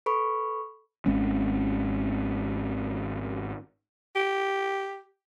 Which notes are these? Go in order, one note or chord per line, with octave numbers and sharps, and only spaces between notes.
A4 B4 B5 C#6
G#1 G#3 C4 C#4
G4